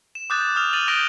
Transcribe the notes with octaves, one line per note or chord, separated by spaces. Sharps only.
E7
D6 D#6 F#6 G6 A6
D#6 F6 F7
F6 A6 D#7 F7 F#7
D6 D#6 G6 A#6 D7 G7